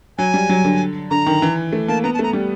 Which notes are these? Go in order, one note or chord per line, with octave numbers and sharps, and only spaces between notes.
F#3 G#5
G3
F#3
D3
D3 A#5
D#3
E3
A3
A#3 A5
B3 A#5
A5
A3 A#5
G3